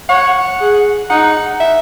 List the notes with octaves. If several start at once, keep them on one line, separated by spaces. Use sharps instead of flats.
C#5 F#5
G#4
D#4 F#5
E5